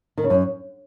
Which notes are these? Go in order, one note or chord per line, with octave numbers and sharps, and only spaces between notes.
D#3
C#3
F#2